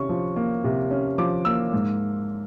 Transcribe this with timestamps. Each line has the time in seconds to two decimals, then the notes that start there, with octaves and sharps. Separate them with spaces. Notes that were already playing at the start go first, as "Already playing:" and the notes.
Already playing: C3 C#4 C#6
0.09 F3
0.36 A#3
0.64 C3
0.91 C#4
1.18 F3 D6
1.45 A#3 E6
1.73 G#2